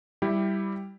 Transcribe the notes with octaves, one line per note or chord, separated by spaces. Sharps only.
G3 E4 G4